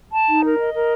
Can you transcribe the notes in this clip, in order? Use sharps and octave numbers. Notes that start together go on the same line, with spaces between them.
A5
D#4
A#4
D#5
A#4